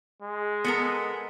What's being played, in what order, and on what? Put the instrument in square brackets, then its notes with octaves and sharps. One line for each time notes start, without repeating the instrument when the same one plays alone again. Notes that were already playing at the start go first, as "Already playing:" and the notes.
[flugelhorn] G#3
[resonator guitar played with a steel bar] B3 A4 A#4